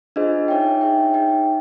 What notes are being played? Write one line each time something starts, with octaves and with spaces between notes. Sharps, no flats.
D4 F4 G#4 C5 D#5
D#4 G#4 C#5 E5 G5
D#4 G#4 C#5 E5 G5
D#4 G#4 C#5 E5 G5